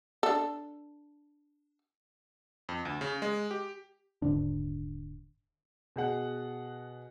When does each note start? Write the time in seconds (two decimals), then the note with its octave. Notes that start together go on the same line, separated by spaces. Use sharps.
0.23 D4 A4
2.69 F2
2.85 D2
3.01 C#3
3.22 G#3
3.51 G4
4.22 D#1 G#2 D3 D4
5.96 B2 G#4 F#5